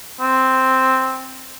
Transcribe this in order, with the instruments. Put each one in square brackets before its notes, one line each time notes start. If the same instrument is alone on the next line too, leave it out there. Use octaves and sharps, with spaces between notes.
[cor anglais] C4